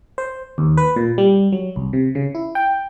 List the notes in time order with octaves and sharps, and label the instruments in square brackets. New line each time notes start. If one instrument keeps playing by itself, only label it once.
[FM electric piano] C5
D#2
B4
A#2
G3
F#3
C2
C3
C#3
E4
G5